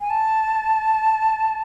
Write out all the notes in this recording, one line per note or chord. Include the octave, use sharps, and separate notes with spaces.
G#5
A5